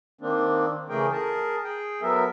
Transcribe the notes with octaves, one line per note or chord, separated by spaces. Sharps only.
D#3 A#3 C4 D4
C#3 E3 A3 G#4 A#4 G5
G#4 A#4 A5
G#4 G5
F#3 B3 A4 A#4 E5